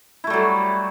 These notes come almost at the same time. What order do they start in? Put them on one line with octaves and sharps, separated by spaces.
E4 A3 G3 F#3